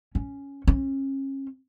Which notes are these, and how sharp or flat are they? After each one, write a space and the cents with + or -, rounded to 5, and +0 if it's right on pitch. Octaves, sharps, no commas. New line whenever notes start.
C#4 +5
C#4 -35